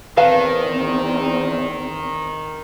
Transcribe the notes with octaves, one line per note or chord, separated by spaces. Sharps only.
E2 D#3 C4 B4 F5 A5